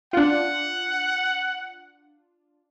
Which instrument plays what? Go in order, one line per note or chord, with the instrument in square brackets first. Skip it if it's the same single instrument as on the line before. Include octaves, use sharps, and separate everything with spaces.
[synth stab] D4 F4 [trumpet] F#5